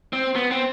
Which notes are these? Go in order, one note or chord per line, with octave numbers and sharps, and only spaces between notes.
C4
B3
C4